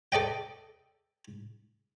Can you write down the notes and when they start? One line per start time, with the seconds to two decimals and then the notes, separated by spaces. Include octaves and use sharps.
0.12 A4 D5 D#5 G5